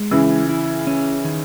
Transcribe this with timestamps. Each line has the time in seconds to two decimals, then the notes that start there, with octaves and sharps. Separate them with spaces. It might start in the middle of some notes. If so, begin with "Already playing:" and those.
Already playing: G#3
0.11 C#3 E3 E4
0.49 E4
0.87 C#4
1.25 D#3